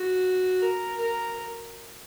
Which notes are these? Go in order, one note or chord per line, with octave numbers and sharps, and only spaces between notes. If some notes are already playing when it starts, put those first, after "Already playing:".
Already playing: F#4
A#4
A#4